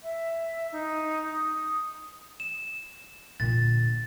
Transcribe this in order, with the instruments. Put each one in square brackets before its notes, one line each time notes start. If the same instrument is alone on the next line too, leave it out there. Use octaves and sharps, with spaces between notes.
[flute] E5
D#4
D#6
[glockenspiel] E7
[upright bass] A#2 D3 [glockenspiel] A6